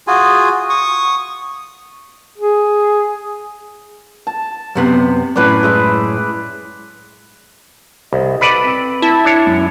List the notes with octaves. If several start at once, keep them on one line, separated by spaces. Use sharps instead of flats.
F4 F#4 G#4 G#5
C#6 D#6
G#4
A5
F#2 C3 B3
F#2 A2 C#4 B4 D5
G#3 E4 E5
C2 D#5
A4 B4 D5 B5 D6
C4
E4 A5
D4 C#5
F#2